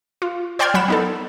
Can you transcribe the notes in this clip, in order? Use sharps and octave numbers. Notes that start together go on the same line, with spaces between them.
F4
C5 D5 G5 C6 F6 G#6
F#3 F#5 B5 E7
B3 D#4 A4